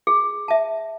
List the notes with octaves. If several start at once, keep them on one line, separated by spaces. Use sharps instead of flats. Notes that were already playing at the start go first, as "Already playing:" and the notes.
G#4
E5 A5